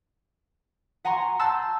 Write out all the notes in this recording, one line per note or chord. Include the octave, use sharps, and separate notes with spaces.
F#5 G#5 A#5 C6 C#6
A5 C6 E6 F#6 G6 A6